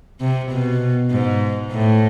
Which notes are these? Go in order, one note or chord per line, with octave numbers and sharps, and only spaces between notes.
C3
B2
G#2
A2